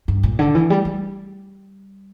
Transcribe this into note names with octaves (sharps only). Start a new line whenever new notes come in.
G2
A#2
D3
E3
G3
G3